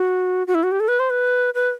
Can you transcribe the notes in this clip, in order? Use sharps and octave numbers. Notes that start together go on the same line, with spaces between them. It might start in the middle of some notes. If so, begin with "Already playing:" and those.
Already playing: F#4
F#4
E4
F#4
G4
A4
B4
C5
B4
B4